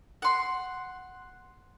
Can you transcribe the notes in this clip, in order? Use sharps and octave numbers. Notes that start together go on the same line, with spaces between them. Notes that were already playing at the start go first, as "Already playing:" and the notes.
F#5 C6